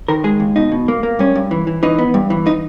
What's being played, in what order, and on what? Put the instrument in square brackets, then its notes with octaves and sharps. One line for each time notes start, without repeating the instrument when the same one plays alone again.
[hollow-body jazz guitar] D#3 A#4
G#3 G#4
D#2
B2 D#4
B2
A#3
A#3
G2 C#4
G2
E3
E3
E3 D#4
B3
G2
E3
D#4